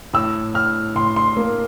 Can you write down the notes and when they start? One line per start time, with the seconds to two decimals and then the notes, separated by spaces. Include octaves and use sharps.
0.13 A2 E6
0.54 A2 F6
0.96 A2 C6
1.16 C6
1.37 A#3